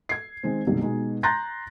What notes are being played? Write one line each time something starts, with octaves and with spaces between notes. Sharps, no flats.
G#6 C7
D#3 G#3 C4
F#1 C2 B2 D#3
B2 G#3 D#4
A#5 C6 F#6 G6 A6 A#6